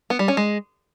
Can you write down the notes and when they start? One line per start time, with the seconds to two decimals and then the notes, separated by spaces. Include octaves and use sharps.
0.10 B3
0.19 G3
0.28 C#4
0.37 G#3